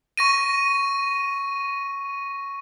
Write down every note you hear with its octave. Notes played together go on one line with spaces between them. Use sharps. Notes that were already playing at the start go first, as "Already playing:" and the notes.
C#6 A#6 D#7